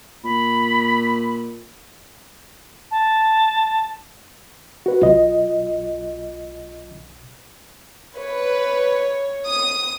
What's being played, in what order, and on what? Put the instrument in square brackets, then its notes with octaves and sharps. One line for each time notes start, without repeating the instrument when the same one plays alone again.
[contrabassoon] A#2 [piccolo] B5
[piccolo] A5
[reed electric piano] F#4 B4
[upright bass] B1 [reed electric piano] F4 D#5
[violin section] B4 [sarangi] C#5
[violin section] D#6